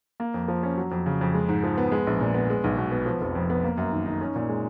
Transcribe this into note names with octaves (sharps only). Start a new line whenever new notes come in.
A#3
F2
F3
C#4
F#3
F2
C#3
F2
G#3
G#2
F3
B3
G#3
A#1
A#2
B3
G#3
B1
B2
B3
F3
F1
F2
B3
A#3
F#2
D#3
D#4
C#4
A#2
G#3